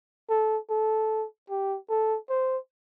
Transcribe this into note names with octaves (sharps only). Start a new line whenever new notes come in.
A4
A4
G4
A4
C5